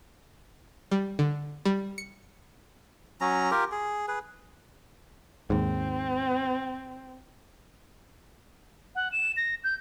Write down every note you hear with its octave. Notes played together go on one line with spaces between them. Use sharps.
G3
D3
G3
C#7
F#3 C#4 A#5
F4 G4 A#4
G#4
G#4 B4
D#2 G#2 C4
F#5
E7
A#6
G6